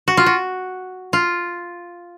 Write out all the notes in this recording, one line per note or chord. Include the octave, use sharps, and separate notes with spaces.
F#4
F4
F#4
F4